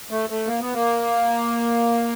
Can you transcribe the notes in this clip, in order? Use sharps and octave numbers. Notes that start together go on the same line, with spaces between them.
A3
A3
A#3
B3
A#3